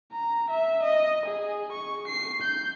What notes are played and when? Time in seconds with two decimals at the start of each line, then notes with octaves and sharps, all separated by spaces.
0.13 A#5
0.50 E5
0.83 D#5
1.26 G#4
1.72 C#6
2.08 C7
2.42 G6